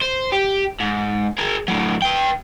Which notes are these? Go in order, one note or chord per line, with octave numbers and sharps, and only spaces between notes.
C5
G4
G#2
G#4 A#4
A2 F#3
B4 G5